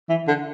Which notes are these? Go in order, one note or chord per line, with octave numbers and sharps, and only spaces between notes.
E3
D3